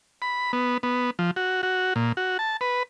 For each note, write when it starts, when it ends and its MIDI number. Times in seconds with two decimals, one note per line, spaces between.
0.22 0.52 83
0.53 0.78 59
0.83 1.10 59
1.19 1.31 53
1.36 1.61 66
1.63 1.94 66
1.96 2.12 46
2.17 2.37 66
2.39 2.57 81
2.61 2.83 71